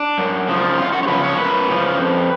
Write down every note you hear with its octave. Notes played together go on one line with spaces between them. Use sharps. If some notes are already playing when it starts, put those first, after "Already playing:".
Already playing: D4
F#2
C#3 F3
F#2 F4
F#4
C#5
C#3 F3 B4
C#5
F#2 B4
C#3 F3
F2